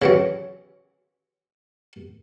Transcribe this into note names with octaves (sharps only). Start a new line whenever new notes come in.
C#3 E3 F#3